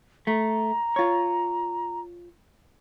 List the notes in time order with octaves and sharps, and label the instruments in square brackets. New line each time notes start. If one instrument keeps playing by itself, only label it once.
[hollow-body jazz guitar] A3 [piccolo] A#5
[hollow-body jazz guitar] F4 C#5